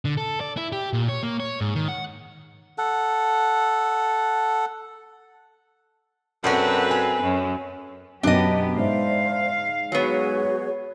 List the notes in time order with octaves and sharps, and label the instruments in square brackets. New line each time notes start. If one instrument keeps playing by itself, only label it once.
[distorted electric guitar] D3
A4
D5
E4
G4
A#2
C#5
A#3
C#5
G#2
D#3
F#5
[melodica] A4 F#5
[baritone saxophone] F#2 [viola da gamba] C4 A4 B4 [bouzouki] D4 F#4
[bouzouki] G#5
[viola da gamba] F#2
[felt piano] F#2 B2 [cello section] B3 G4 [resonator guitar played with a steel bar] D4 D#5
[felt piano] G#2 [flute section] C5 D5 E5 [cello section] F5
[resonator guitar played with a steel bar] F#3 B3 [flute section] F#4 G#4 C#5